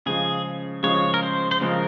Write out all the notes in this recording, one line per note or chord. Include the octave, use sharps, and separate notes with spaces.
C#3 F3 G#3 G#4
C#3 F3 G#3 C#5
A#4
C5
C5
C#3 F3 G#3 A#4